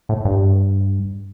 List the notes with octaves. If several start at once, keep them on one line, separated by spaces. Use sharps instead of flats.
A2
G2